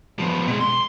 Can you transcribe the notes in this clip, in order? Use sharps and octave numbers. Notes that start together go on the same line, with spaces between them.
F3 B3
B2 G#3
C6